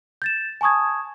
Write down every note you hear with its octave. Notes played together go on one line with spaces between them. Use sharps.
G6 A6 E7
G#5 A5 C#6 D#6 G#6